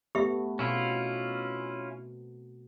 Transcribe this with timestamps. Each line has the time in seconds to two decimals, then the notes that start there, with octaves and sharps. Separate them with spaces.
0.15 A3 B3 G4 E5
0.59 B2 C4 C#4 E4 F4